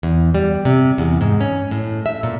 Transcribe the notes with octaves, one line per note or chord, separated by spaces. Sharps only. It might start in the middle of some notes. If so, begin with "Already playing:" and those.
E2
G3
C3
E2
G#2
C#4
A2
E5
A#2